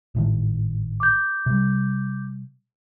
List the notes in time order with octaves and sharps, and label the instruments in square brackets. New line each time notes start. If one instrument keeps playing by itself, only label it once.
[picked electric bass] G#1 A2 D#3
[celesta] D6 G6
[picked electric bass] C3 G3